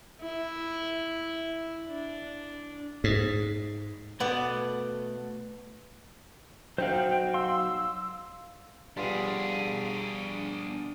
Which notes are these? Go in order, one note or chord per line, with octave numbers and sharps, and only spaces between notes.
E4
D4
G#2
B2 A3 B3 A4 D5 F#5
F#3 D#4 F#4 C5 F5 G5
F5 C6 E6
G3 B3 D4 F4 G#4